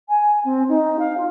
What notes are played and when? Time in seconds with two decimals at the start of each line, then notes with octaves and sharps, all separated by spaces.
0.09 G#5
0.45 C4
0.68 D#4
0.99 F5
1.17 F4